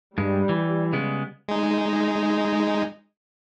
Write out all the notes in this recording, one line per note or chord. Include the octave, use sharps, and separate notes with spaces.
G2 G3 G#3
E3
C#3 G#3 B3
G#3 D#4